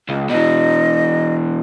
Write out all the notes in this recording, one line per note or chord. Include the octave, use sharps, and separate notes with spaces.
C#2
B2 E3 D#5